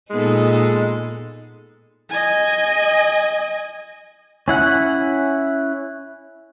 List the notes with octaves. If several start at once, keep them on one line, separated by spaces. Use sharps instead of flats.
A#2 G#3 B3 D#4 A4
D#5 G#5
C#4 E4 F#5